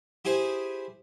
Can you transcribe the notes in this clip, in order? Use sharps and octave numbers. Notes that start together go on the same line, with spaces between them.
E4 G4 G#4 C5